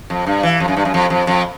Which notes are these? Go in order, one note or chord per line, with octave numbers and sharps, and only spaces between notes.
F2
G2
E3
F2
F#2
G2
F#2
F2
F2
F2